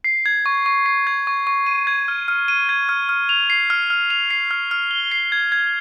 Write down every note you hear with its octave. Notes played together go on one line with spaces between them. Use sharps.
C7
G#6
C#6
C#6
C7
G#6
C#6
C#6
D#7
G#6
F6
F6
D#7
G#6
F6
F6
F7
C7
F6
F6
F7
C7
F6
F6
G7
C7
G#6
G#6